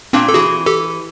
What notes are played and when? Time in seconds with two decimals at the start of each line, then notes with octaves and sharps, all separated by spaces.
0.13 A#2 C4 D4
0.28 A4
0.34 E3 F#4 G#4
0.66 G4 A4